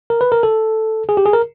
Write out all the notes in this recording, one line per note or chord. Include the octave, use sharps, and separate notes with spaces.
A#4
B4
A#4
A4
G#4
G4
G#4
A#4